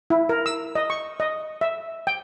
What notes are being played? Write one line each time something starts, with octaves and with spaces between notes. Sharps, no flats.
E4
A#4
E6
D#5
C#6
D#5
E5
G5